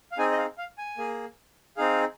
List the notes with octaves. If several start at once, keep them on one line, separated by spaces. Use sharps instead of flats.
F5
C4 D#4 G#4 G#5
D#5
F5
F5
G#5
A#3 G#4
C4 D#4 G#4 F5